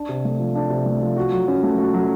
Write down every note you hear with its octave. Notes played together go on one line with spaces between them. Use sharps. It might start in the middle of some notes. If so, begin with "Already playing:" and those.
Already playing: D4
C3
A3
F3
D4
C3
A3
F3
F#4
F#3
C#4
A3
F#4
F#3